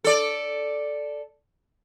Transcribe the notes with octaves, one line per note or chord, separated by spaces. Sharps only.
A4 D5